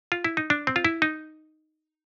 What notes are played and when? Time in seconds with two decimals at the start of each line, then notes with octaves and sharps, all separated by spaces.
0.12 F4
0.24 E4
0.37 D#4
0.50 D4
0.67 C4
0.76 F4
0.85 E4
1.02 D#4